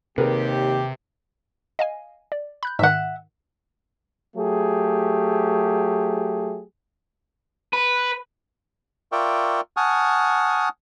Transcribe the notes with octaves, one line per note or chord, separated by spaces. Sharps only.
D#2 C3 G4 G#4 A#4 B4
D#5 F5 G#5
D5
B5 F#6 G6
G#2 D#3 E5 F#5
F#3 A3 G4 G#4
B4
F4 A#4 D5 E5 G5 C#6
F#5 G#5 A5 C#6 D#6 F6